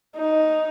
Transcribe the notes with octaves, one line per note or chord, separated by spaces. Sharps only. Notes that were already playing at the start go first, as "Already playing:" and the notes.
D#4